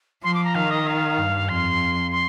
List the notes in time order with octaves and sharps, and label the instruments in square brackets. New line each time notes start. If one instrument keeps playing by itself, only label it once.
[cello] F3 [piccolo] C6
[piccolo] D6
A#5
[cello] D#3 [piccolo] F5
[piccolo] D#5
F5
[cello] G2
[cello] F2 [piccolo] C6
[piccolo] C6